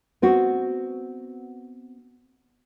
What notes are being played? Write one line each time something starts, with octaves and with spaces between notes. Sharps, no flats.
B3 C4 F#4